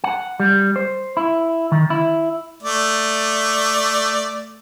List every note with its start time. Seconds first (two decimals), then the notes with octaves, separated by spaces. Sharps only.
0.04 F#5
0.40 G3
0.76 C5
1.17 E4
1.72 D#3
1.90 E4
2.63 A3 D5